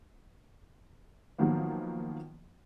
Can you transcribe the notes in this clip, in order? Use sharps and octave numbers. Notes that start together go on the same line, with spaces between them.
D#3 F3 F#3 A#3 B3